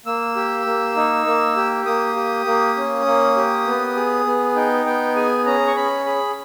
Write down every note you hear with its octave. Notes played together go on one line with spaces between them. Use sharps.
A#3 E6
G4
A#3
D#4
A#3
G4
A#3 D#6
G4
A#3
C#4
A#3
G4
B3
G#4
B3
D#4 G5
B3 G5
G#4 G#5
C#4 A#5
C#6
C#4 B5
G#4 B5